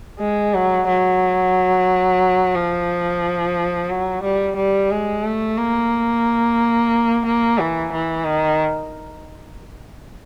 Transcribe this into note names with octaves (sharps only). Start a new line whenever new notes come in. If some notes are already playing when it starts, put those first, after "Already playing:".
G#3
F#3
F#3
F3
F#3
G3
G3
G#3
A3
A#3
A#3
E3
E3
D#3